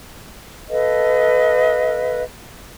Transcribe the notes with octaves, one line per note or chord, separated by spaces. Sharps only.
A4 B4 D#5 F5